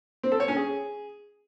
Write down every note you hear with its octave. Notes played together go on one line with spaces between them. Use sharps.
C4
A4
C#5
C#4
G#4